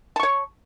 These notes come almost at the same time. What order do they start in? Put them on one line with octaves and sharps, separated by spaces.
A5 C#6 C#5